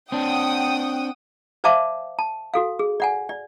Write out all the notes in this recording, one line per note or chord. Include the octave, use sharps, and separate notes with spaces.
C4 D4 F#5 G5 D#6
C5 D5 E5 F5 A5 D6
A5
F#4 A4 F5
G#4
D5 F#5 G#5
D5